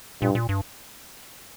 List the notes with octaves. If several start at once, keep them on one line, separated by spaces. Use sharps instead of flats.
G2 A#2
A#2
G2